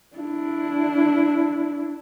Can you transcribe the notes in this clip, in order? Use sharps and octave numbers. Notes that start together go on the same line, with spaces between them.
D4 E4